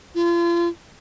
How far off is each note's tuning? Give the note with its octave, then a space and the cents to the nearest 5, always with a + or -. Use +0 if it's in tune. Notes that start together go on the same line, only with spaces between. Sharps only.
F4 -35